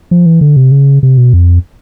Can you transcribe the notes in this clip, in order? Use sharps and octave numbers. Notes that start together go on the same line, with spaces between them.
F3
E3
D3
C3
C#3
C3
B2
F2